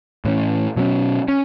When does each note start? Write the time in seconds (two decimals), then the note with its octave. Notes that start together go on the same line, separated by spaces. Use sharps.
0.25 A2 E3 C#4
0.76 B2 F#3 C#4
1.28 C#4